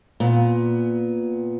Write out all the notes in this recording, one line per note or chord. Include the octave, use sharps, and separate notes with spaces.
A#2 B3